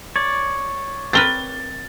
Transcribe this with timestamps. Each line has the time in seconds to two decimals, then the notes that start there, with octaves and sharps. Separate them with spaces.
0.16 C#5 D5
1.13 C4 A#4 B4 A6 G7